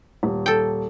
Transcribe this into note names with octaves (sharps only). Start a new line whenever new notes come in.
D#1
A4 G5